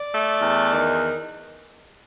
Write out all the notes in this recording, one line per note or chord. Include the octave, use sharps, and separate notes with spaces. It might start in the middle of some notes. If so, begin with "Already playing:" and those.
Already playing: D5
A3
E2
D#3